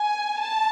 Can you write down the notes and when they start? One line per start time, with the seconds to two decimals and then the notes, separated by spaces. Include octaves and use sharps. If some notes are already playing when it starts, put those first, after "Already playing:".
Already playing: G#5
0.40 A5